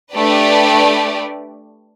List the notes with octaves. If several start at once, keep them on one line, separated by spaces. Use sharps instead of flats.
A3 D4 G4 B4 D5